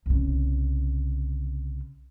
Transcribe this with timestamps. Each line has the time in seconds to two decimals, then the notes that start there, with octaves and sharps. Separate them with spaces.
0.06 C2 C#3